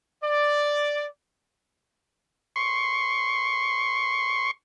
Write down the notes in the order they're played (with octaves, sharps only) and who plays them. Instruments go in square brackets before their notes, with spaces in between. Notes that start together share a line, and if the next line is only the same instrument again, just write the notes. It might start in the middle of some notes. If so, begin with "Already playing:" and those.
[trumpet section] D5
[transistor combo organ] C6 C#6